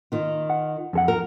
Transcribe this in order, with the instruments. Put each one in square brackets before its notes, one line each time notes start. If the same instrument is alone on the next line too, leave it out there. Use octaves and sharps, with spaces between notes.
[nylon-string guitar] D#3 F4
[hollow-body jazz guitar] F#5
F2 A4 F#5
[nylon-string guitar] A#4